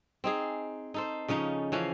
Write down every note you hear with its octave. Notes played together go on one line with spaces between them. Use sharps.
C4 D#4 G#4
D#4 A4 C5
C#3 F3 C#4 D#4
E3 F3 C#4 F5